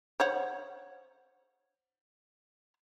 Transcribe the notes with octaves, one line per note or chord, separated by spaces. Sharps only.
C5 C#5 F#5